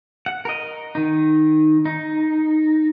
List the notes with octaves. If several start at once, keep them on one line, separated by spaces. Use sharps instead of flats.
F#5
A#4 D#5
D#3 D#4
D#4